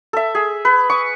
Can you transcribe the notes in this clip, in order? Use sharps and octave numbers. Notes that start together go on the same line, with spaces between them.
A4 E5
G#4
B4
C#6 D#6